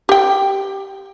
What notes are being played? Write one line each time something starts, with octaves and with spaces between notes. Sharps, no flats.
G4 G5